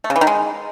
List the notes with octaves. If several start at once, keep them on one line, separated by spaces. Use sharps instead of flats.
A3
C#3
E3
D#3
G#3